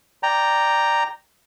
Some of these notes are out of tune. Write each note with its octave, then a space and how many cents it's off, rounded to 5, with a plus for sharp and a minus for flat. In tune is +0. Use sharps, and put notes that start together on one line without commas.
D5 +0 G5 +0 A#5 +0